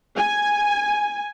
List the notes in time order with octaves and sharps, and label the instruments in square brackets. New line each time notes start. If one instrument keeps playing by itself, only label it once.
[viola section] G#5